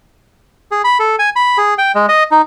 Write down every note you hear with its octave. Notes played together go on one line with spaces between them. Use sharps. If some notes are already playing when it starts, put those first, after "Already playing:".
G#4
B5
A4
G#5
B5
G#4
G5
G#3
D#5
D#4